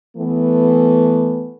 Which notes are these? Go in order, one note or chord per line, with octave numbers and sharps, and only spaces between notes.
E3 A3 B3